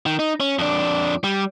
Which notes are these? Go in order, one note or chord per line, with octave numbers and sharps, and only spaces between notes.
D#3
D#4
C#4
F2 D4
G3